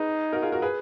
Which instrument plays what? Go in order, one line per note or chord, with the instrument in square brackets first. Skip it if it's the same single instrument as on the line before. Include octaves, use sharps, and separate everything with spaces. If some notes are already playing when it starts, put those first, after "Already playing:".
Already playing: [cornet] D#4 [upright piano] G#4 B4
[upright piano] F#4 A#4
F4 G#4
F#4 A#4
G#4 B4